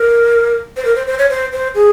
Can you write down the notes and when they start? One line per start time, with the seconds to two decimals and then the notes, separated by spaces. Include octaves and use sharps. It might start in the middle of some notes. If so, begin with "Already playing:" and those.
Already playing: A#4
0.77 C5
0.85 A#4
0.96 C5
1.07 C5
1.19 C#5
1.30 C5
1.52 C5
1.75 G#4